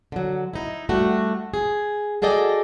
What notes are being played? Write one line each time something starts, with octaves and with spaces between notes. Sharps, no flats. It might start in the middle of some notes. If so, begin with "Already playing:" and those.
D3 F#3
D#4 E4
G3 A3 D4 F#4
G#4
F#4 G#4 A4 D5 D#5 G5